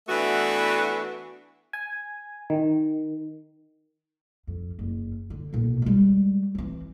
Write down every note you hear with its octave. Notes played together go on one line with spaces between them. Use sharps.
E3 A3 B3 D4 F#4
G#5
D#3
F2
F#1
D3
B1 A#2
G3 G#3
E3 C4